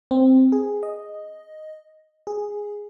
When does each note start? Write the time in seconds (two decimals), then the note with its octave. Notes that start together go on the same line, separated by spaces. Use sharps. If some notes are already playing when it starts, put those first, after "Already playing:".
0.11 C4
0.52 G#4
0.83 D#5
2.27 G#4